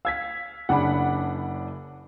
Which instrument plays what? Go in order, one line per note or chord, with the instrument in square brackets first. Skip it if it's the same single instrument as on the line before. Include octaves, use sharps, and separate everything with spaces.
[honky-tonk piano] F5 [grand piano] E6 G#6 B6
[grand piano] F#1 C#3 D4 [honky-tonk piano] F#5 B5